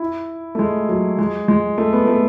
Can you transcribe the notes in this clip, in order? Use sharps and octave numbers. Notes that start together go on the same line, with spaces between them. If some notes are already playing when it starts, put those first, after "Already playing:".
Already playing: E4
A3
G#3
F#3
G#3
G#3
A3
B3
A3